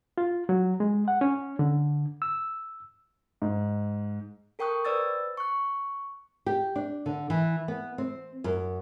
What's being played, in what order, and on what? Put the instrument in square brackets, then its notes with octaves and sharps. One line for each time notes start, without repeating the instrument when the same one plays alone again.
[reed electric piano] F4
F#3
G#3
F#5
C#4
D3
E6
[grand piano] G#2
[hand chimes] A4 A#4 G5 C#6 D#6 F#6
B4 C5 D5 E6 A6
C#6 F#6
[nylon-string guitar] G4
D4
D3
E3
B3
C4
F#2